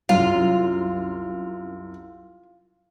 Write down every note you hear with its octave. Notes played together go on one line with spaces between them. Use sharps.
C2 F#2 F4